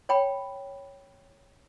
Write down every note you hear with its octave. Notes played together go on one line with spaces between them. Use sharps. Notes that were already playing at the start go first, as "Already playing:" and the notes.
C#5 G5 B5